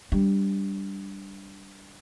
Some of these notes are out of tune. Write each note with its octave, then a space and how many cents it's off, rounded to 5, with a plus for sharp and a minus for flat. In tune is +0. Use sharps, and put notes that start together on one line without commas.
G3 +0 D4 -10